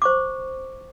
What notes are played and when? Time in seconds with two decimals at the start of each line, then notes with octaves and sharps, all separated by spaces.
0.02 C5 C#6 D6